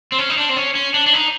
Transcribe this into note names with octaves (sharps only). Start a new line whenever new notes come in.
C4
C#4
D#4
D4
C4
C#4
C#4
D4
D4
D#4